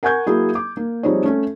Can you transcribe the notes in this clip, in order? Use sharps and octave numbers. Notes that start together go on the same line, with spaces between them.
A#4 F#5 G#5 C#6 G6 G#6
F#3 A#3 E4 G#4
D6
A#3
F3 G3 C4 D#4 G#4 C#5
A3 C#4 A4